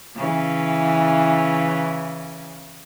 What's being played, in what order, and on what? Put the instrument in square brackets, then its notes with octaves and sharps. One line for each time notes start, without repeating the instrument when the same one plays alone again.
[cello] C#3 E3